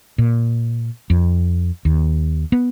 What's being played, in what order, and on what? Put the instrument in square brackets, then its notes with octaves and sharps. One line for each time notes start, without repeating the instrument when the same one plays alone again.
[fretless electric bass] A#2
F2
D#2
B3